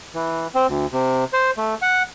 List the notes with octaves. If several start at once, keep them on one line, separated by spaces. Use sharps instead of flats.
E3
C4
D2
C3
C5
A3
F#5